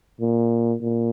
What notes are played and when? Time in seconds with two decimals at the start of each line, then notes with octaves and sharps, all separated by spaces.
0.21 A#2
0.81 A#2